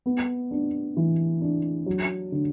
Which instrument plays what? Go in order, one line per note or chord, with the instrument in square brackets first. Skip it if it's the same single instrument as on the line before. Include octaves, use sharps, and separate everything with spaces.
[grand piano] B3
D4
E3
D4
F#3
D3